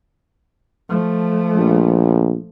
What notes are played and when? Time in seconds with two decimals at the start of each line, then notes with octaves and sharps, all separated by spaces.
0.89 F3 A3
1.57 A#1